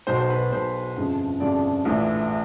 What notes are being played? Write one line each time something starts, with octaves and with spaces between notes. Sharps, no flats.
B1 B2 C5
C5
B4
B1 B2 C5
G1 F2 C#3 F3
G1 F2 C#3 F3 D5
A#1 A2 E3